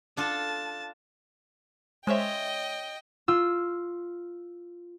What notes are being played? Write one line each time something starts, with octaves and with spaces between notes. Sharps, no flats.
D4 F4 A4 A5
G#3 C#4 C5 C#5 D#5 E5 G5
F4 E6